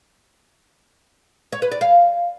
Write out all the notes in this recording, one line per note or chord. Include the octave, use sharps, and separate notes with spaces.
C#5
B4
D5
F5